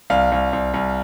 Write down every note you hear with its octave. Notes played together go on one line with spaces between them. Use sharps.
C2 F5
C2
C2
C2